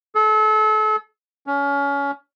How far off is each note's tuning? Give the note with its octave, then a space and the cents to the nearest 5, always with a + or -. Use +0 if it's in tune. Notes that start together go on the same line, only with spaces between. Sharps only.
A4 -35
C#4 +25